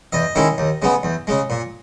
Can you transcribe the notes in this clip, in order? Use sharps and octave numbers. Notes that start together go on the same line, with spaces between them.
E2 D#5
D#3 G#3 C#4 E4
D#2
C#3 G#3 B3
E2
C#3 G#3
A#2